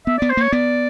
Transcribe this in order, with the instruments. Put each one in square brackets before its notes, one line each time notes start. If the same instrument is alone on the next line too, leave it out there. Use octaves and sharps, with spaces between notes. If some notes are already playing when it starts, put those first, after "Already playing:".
[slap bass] B3 [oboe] E5
[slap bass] B3 [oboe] D5
[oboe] C5
[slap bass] A#3 [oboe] C#5
[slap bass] B3 [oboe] D5